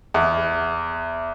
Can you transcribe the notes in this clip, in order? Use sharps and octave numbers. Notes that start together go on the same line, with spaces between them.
E2